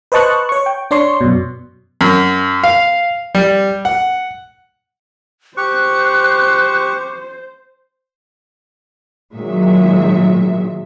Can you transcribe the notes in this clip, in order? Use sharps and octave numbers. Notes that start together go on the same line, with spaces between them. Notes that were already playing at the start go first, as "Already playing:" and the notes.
B4 C5 D#5 A5 C#6 F#6
C#5 C#6
G5
D4 C#5 D5 C6 C#6
F#2 B2
F#2
F5
G3
F#5
G4 C5 C#6 F#6
A#2 D#3 F#3 G#3 E5